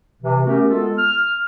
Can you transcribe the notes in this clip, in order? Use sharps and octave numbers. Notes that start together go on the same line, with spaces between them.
C3 E3
A3 B3 C#4 F#4 G4 A#4
G#3 B3 F4 A4
F6